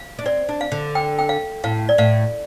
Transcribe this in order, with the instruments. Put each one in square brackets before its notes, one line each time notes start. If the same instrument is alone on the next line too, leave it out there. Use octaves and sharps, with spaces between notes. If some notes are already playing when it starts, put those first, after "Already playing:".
Already playing: [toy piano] F5
[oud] D4
[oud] C4 [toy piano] D5
[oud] D4
[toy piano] F5
[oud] D3
[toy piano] G5
G5
F5
[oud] A2 [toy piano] F5
[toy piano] D5
[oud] A2 [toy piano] F5